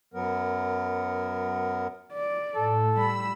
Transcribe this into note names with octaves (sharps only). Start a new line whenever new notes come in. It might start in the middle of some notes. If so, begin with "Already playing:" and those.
F#2 F#3 B3 A#4
D5
A2 A4
G3 B5 E6